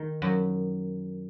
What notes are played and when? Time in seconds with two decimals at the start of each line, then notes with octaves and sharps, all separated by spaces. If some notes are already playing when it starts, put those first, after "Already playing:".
Already playing: D#3
0.22 F#2